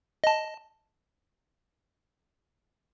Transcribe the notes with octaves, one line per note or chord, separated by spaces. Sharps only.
D#5 A5